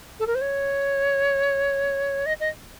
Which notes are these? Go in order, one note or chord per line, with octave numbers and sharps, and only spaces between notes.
A4
A#4
C5
C#5
D#5
D#5